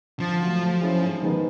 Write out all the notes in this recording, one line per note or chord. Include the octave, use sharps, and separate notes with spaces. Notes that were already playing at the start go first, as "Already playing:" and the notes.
D3 F3
F#3 A3
A3
C#4 E4 G#4 C5
G#2
D#3 G#3 B3 D#4